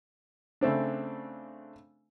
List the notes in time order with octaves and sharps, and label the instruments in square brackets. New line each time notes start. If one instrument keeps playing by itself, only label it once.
[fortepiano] C#3 A3 C4 D4